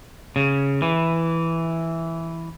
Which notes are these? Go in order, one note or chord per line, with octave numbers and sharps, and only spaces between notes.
C#3
E3